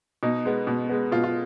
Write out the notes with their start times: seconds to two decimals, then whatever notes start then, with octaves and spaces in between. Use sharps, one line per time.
0.23 B2 D#4
0.45 G#3 B3
0.67 B2
0.89 G#3 B3
1.12 B2 F4
1.24 F4